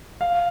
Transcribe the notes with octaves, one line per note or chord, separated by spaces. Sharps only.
F5